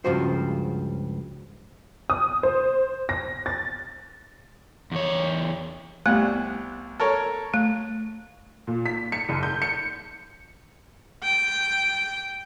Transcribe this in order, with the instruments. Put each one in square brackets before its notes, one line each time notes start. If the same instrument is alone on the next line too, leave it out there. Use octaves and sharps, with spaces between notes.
[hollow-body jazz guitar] C#2 G2 C#3 F3 F#4 C5
[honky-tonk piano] D#6
C5
A#6
A6
[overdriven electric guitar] E2 C#5
[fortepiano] C2 G3 F#5 [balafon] A3 B3
[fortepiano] A4 A#4 C#5
[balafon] A3
[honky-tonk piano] A#2
B6
C#7
F#1
G6
C#7
[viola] G5